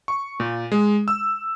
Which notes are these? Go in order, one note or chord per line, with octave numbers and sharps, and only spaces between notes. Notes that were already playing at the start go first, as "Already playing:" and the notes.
C#6
A#2
G#3
E6